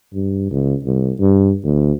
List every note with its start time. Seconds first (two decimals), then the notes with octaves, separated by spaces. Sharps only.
0.14 G2
0.51 C#2
0.84 C2
1.20 G2
1.64 D2